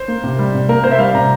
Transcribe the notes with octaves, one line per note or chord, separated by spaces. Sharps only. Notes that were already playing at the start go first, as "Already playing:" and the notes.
Already playing: C5
A#3
C3
G3
C3
A#3 A#4
C3 C5
E5
G3 F5
C3 A#5